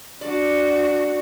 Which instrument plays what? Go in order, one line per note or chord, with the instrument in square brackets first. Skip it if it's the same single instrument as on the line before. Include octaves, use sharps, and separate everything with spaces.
[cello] D4 F#4 [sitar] D5